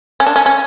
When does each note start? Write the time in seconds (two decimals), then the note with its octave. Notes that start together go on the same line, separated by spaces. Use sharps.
0.20 C#4
0.26 D4
0.36 C#4
0.46 C#4